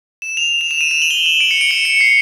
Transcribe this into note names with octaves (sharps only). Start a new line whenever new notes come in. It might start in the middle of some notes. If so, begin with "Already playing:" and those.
E7
F7
F7
E7
D#7
E7
F#7
G7
F#7
D7
C#7
D7
C#7
C#7
C7